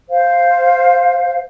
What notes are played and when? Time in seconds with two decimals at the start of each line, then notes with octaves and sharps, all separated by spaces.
0.09 C5 F5